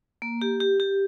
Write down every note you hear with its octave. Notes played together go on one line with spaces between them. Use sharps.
A#3
G4
G4
G4